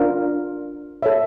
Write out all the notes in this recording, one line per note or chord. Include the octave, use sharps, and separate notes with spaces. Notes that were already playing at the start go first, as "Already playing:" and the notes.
Already playing: D4 F4 A#4
A4 C#5 E5